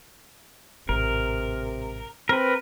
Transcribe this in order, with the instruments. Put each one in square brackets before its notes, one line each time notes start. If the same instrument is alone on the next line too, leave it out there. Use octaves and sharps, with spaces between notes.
[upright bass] A1 G#2 [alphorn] C3 [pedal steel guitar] A#4
[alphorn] C4 [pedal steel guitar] A#4 B4